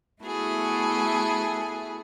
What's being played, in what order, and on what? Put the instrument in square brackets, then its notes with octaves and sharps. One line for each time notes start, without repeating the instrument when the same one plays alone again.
[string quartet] A3 B3 E4 F#4 G#4 A4